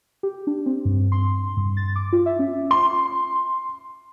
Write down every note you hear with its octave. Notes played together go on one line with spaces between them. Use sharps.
G4
D4
C4
G2
C6
G2
A6
D6
F4
E5
C#4
C6